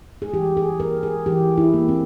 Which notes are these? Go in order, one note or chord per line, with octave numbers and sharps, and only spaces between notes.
G#4
E3 G4
G#4
A#3 A#4
G#4
E3 G4
E4
A#3
C4